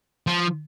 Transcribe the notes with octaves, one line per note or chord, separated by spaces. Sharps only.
F3